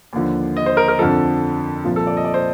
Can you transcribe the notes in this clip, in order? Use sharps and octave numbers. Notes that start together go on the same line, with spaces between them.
D#2 D3 F3
D#5
C5
A#4
A#4
F2 D3 F3 A4
C2 A#2 F3 F4
A4
D5
D#5
D5
C5